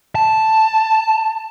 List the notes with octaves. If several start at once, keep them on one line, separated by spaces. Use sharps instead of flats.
A5